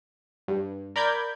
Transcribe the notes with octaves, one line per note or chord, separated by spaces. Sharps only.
G2
A#4 D5 B5 G6 G#6